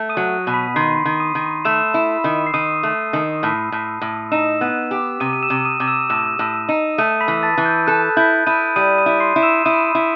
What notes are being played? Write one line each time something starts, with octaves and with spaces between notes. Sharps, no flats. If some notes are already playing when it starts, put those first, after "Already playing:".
Already playing: A3
D#6 D#7
F#3
B2
B5 B6
D#3 C6 C7
D#3
D#6 D#7
D#3
A3 E6 E7
E4
D#3
C7
D#3 D#6 D#7
A3
D#3
A2
A2
A2
D#4 E6 E7
B3
G4
C3 D#6 D#7
D#7
E6 E7
C3
D#6 D#7
C3
E6 E7
A2 E6 E7
A2
D#4
A3 D#6 D#7
B5 B6
E3
A5 A6
E3
G6
A4 F#6
E4 G6
E4 D#6 D#7
G3 D#6 D#7
D#6 D#7
E4
C6 C7
E4
E6 E7
E4 D#6 D#7
E4